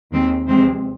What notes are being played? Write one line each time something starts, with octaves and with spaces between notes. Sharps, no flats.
D#2 D#3 G#3 C4
E2 C3 F3 G#3 C4